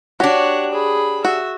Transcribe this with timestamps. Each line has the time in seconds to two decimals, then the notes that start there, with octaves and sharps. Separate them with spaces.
0.20 D4 F#4 G4 C#5 F#5
0.72 G#4 B5
1.25 F#4 E5